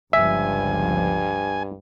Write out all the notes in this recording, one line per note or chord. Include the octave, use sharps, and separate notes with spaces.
G1 C#2 G2 F3 E5 G#5